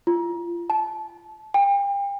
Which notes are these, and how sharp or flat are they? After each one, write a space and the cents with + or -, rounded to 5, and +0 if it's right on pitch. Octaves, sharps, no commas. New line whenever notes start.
F4 -25
A5 -25
G5 +35